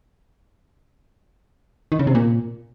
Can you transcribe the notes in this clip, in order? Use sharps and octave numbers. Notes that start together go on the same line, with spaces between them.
D#3
C#3
C3
A#2